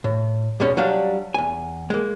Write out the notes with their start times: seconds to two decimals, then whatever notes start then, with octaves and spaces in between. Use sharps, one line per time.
0.04 A2
0.60 B1 E2 B2 G#3 C#4
0.77 F#3 G3 D4 F5
1.34 E2 G#5
1.90 G#3 A#3